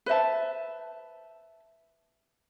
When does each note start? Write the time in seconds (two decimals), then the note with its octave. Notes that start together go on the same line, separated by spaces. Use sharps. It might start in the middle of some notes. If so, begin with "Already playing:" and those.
0.06 B4 C5 E5 A5